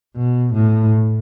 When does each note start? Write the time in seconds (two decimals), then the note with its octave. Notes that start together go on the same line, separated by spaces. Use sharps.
0.16 B2
0.53 A2